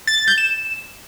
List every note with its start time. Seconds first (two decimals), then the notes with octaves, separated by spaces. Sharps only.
0.07 A6
0.18 A6
0.28 G6
0.38 E7